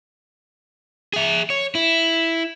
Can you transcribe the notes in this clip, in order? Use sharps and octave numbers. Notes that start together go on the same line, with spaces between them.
G#4 E5
C#5
E4